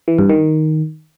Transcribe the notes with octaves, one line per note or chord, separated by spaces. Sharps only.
E3
G2
D#3